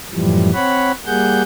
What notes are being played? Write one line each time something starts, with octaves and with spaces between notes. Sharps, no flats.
F#2 A2 E3 F3 G3
C4 C#5 F#5 B5
G3 A#3 G#4 F#5 G6